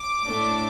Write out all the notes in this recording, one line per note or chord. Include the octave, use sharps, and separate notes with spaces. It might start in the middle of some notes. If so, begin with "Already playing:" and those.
Already playing: D6
A2 A3 D4